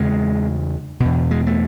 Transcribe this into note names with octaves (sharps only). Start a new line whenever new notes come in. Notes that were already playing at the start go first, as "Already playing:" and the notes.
Already playing: E2 C#3 G#3
E2 B2
G#3
A3